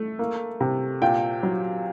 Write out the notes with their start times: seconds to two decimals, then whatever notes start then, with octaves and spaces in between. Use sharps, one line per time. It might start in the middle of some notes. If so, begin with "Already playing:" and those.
Already playing: A3
0.19 A#3
0.61 C3
1.02 A#2 G5
1.43 F#3